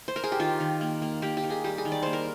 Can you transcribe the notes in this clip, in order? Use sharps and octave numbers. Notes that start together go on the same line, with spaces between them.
C5
A#4
G#4
G4
D#3 F4
D#3
A#3
A#3
A#3 G4
G4
D#3
G#4
G3 G4
G#4
D#3
D5
A#3 C5
A#4